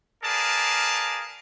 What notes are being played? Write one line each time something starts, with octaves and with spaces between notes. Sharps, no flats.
G#4 A#4 B4 D5 F5 A5